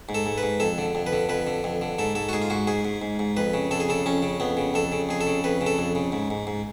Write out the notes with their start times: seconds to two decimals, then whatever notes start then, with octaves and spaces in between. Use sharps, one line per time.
0.09 G#2
0.14 A4
0.26 G#2
0.38 B4
0.43 G#2
0.60 F2 A4
0.78 D3
0.95 F2
1.07 B4
1.13 D3
1.29 F2 B4
1.47 D3
1.64 F2
1.82 D3
1.98 G#2 A4
2.15 G#2 A4
2.29 F#4
2.33 G#2 G#4
2.42 F4
2.50 G#2 F#4
2.67 G#2 G#4
2.85 G#2
3.02 G#2
3.19 G#2
3.37 F2 B4
3.54 C#3
3.71 F2 A4
3.80 G#4
3.88 C#3 A4
4.06 F2 C#4
4.22 C#3
4.40 F2 B3
4.57 C#3
4.74 F2 A4
4.92 C#3
5.09 F2 G#4
5.21 A4
5.27 C#3
5.44 F2 B4
5.61 C#3
5.66 A4
5.78 F2
5.95 C#3
6.12 G#2
6.30 G#2
6.47 G#2